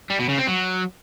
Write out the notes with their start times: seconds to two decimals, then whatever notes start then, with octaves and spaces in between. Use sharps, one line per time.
0.10 G3
0.19 B2
0.29 C#3
0.38 C4
0.47 F#3